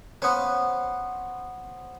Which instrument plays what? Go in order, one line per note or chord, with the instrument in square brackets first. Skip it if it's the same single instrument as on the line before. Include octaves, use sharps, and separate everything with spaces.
[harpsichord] B3 C#4 [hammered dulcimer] C5